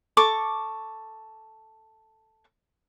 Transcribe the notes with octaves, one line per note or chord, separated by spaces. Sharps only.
A4 C#6 D6